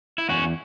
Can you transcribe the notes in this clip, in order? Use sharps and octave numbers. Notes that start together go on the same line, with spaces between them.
E4
E2 C#4 F#4